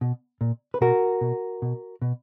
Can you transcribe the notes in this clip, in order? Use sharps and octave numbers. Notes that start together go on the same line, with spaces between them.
B2
A#2
B4
B2 F#4 A#4
B2
B2
B2